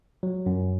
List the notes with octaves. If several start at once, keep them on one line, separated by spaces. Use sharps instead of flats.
F#3
F#2